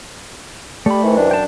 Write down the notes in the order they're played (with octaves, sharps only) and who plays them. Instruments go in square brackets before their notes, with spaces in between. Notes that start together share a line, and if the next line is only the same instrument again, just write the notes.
[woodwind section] G3 [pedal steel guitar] A3 B5
[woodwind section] C3 D#3 E3
[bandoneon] F#2 D4
[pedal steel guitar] G5 A5